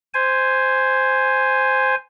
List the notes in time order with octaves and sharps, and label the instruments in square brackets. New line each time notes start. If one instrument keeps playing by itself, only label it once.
[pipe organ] C5 G#5